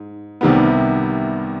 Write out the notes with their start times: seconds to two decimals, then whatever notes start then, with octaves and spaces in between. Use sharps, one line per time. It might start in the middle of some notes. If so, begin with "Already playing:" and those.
Already playing: G#2
0.41 C2 C3 D#3 G3 B3